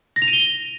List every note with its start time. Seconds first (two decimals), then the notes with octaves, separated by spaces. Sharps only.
0.16 A#6
0.22 F7
0.27 D#7
0.33 G7